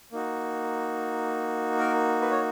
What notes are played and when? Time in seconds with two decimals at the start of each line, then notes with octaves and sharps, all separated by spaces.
0.12 A#3 D#4 F#4
1.79 A#4
2.21 B4
2.31 C#5